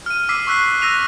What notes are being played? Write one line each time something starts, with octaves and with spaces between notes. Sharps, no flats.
F6 D#7
D6 E6 B6 C7 D#7
C#6 E6 F#6 B6 C7
E6 F#6 A#6 B6 D#7 F7